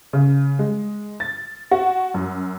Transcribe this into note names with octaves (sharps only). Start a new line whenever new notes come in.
C#3
G#3
A6
F#4
F#2